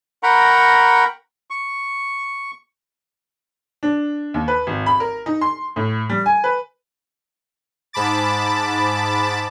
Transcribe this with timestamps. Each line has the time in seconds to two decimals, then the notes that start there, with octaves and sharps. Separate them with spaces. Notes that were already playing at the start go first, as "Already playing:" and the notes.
0.23 A#4 F#5 G5 A#5 B5 C#6
1.50 C#6
3.83 D4
4.34 D#2
4.48 B4
4.67 G#1
4.86 B5
5.00 A#4
5.26 D#4
5.41 C6
5.76 A2
6.09 G3
6.26 G#5
6.44 B4
7.93 G#2 A5 B5 D6 A6